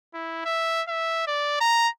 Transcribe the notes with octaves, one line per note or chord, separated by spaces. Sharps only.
E4
E5
E5
D5
A#5